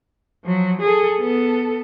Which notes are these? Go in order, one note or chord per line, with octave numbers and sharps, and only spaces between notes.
F3 F#3
G#4 A4
B3 A4